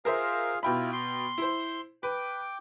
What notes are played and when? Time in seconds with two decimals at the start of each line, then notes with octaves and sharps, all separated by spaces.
0.05 F4 G#4 A#4 C5 E5 F5
0.63 B2 E4 F4 G5 B5
0.93 C6
1.38 E4 C5
2.03 B4 G5 D6